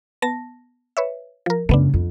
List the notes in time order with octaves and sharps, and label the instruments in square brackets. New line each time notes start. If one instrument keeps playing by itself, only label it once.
[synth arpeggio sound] B3 A5 A#6
B4 C#5 E5
F3 A#4
[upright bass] F#2 C#3 [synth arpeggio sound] A3 B3 D4
[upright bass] F2